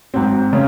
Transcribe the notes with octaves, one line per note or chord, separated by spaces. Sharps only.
G#2 F#3 C4
C#3 C#4